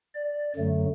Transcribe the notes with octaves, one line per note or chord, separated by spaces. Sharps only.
D5
F#2 D3 F#3 A3